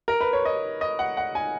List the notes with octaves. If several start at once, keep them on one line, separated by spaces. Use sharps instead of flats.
A#4
B4
C#5
D#5
D#5
F#5
F#5
G#5